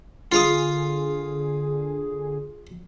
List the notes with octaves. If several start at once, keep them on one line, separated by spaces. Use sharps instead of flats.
D3 F4 G#4 F5 D#6